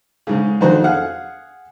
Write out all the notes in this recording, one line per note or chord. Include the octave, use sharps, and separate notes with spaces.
G#2 C#3
F2 D#3 F#4 C5
G#4 F5 F#5